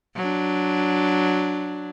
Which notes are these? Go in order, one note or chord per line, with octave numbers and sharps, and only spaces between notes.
F#3 D4